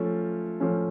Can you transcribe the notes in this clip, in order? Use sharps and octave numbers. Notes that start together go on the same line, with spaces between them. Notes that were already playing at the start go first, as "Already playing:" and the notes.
Already playing: F3 A3 C#4
F3 A3 C#4